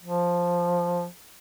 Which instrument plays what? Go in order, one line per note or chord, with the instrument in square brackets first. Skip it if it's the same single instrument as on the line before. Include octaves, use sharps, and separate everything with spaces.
[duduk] F3